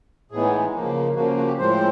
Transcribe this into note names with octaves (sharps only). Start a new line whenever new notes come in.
A2 E3 G#3 B3 D#4 G#4
C#3 F3 A#3
C#3 F3 A#3 F#4
F#4
G4
A2 F3 G#3 C4 C5